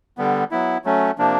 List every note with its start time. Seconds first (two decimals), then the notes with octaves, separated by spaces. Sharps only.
0.17 D3 G3 B3
0.51 F#3 B3 E4
0.85 F#3 A3 C#4
1.18 C3 F3 A#3 D4